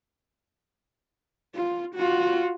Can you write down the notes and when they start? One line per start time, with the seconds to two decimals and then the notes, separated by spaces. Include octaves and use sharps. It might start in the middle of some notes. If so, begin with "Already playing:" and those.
1.55 F4
1.95 F4 F#4